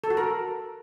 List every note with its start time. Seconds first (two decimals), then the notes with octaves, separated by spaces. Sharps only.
0.04 A4
0.10 F#4
0.17 A#4